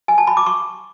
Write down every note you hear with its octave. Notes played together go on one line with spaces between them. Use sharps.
G#5
A5
B5
D6
C#6